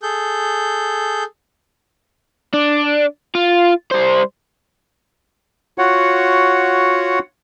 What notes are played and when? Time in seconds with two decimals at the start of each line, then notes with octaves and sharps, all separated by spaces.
0.03 G#4 A4 G6
2.54 D4
3.35 F4
3.91 G3 C5
5.78 F4 F#4 C#5 F#5